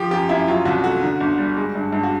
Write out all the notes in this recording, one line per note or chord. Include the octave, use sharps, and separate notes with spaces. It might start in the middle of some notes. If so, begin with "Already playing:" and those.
Already playing: F3 G4
F#2 G4
F#2 E4
F#3 F4
C2 F#4
A3 F#4
D3
G1
G3
G#3
G2
G2
F#4